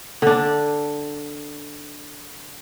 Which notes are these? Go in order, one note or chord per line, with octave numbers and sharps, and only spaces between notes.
D3 D4